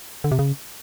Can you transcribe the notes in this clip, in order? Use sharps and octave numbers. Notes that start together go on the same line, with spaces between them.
D3
C3
C#3